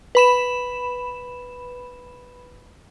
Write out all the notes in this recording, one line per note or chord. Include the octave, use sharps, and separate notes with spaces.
B4 B5 E7